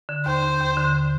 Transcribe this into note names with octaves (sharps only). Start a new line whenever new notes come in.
D3
D#2 C5
D#2
D#2
D3